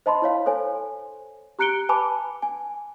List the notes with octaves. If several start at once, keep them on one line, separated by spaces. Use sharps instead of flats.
C5 D#5 A5 B5 C6
E4 C#5 F5
A4 C5 C#5 G#5
G4 A#5 F#6 C#7 D7 G7
B4 G#5 A5 B5 D6
G#5